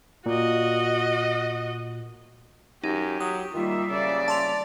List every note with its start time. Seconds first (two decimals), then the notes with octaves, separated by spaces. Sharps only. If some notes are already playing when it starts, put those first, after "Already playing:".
0.26 A#2 F#4 D#5
2.84 F#2 D#4 G4
3.20 F#3 D#6
3.54 D#3 G3 A#3 F4 E5
3.90 C#3 D5
4.28 A5 C6 F7